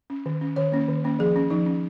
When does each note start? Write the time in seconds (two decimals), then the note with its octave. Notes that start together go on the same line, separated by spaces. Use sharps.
0.10 C#4
0.26 D#3
0.41 C#4
0.56 D#3 C#5
0.72 A#3 C#4
0.88 D#3
1.04 A#3 C#4
1.19 F3 G#4
1.36 C#4
1.50 F3 D#4
1.66 C#4